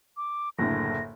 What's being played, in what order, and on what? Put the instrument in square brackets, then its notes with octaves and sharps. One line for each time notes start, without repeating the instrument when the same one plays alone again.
[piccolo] D6
[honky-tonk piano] F#1 A2 D3 [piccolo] A#6